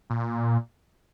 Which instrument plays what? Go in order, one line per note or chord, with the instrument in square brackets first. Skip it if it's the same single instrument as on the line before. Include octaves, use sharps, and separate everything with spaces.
[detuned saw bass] A#2